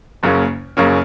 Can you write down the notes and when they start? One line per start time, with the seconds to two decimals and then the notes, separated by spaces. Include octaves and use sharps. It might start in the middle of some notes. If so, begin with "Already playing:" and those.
0.23 F#1 F#2 C#3 A#3 C#4
0.77 F#1 F#2 C#3 A#3 C#4